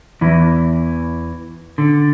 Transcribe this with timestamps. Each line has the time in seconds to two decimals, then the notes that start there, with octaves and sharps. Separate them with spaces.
0.21 E2 E3
1.78 D3